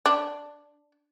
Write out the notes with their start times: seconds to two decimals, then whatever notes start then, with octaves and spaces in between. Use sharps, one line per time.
0.06 D4